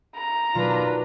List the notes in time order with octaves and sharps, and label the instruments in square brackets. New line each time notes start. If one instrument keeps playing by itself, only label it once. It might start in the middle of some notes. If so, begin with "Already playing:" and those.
[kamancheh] A#5
[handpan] B2 D#3 F#3 [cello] D4 B4 [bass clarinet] F4